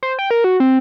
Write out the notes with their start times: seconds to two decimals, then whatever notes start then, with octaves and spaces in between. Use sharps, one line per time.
0.03 C5
0.19 G5
0.31 A#4
0.44 F#4
0.60 C4